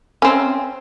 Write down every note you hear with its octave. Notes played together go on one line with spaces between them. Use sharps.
C4 C#4